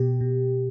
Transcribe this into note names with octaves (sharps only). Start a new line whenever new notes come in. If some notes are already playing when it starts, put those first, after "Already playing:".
Already playing: B2 G4
B2